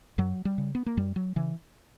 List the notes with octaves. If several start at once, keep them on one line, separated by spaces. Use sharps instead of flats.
F#2 F#3
G3
C#3
B3
A#3
F#2 G3
F#3
C#3 E3